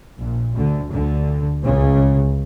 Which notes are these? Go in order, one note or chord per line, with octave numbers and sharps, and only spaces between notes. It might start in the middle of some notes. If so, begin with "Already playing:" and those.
A#1 A#2
D2 D3
D2 D3
C#2 C#3